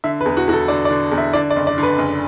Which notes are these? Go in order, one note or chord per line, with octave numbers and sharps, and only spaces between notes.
D3 E5
B4
E2
F#4
E2 F#4
A4
D3 D5
D5
D3
E2
E5
D3 D5
D5
F#1
D5
D3
B4
F#1